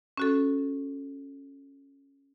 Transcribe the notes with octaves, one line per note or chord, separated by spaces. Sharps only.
C#4 F#4 A4